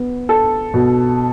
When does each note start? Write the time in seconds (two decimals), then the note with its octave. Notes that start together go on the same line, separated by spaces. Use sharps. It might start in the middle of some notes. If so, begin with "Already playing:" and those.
Already playing: B3
0.29 A4
0.74 B2